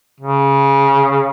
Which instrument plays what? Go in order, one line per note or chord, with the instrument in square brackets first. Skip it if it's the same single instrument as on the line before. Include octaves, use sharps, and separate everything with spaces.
[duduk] C#3